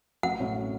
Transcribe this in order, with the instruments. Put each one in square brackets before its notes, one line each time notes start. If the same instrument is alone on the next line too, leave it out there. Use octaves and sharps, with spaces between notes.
[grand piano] A1 [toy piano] F#5
[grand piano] A2 F#3 C#4